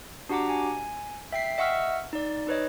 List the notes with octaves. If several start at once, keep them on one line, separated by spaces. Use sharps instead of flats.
D4 F#4 G4 F#5 A#5 D6
G#5
E5 G5 B6 C7
D#5 E5 F#5 C#6 E6 F6
D#4 D5
D#4 B4 C#5 D#5